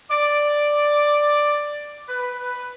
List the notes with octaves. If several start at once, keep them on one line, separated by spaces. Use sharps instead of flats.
D5
B4